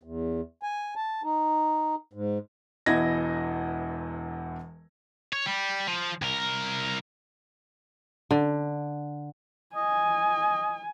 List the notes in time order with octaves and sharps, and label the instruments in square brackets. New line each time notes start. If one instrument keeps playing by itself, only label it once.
[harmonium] E2
G#5
A5
D#4
G#2
[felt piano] E1 E2 E4 D#5 G#6 A#6
[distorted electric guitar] C#5
G3
F3
C2 A#4
[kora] D3
[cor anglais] D#5 [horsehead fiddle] G#5